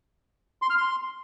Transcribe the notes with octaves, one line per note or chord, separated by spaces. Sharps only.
C6
F6
C6